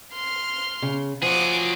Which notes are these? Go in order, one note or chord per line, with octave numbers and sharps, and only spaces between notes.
C6 F6
C#3
F3 F#3 G#4 F#5 D6